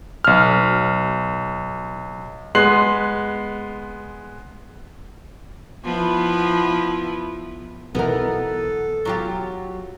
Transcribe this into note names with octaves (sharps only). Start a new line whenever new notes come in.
B1 F6
G#3 B3 C6 F#6 C7 F#7
F3 B3 E4
B1 B2 E3 B3 A4 A#4
F#3 F4 G4